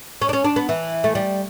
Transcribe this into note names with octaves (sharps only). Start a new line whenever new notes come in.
C#4
D4
C#4
D4
B3
E3
A3
G3